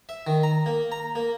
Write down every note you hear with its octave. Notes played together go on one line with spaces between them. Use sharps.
E5
D#3
A#5
A#3
A#5
A#3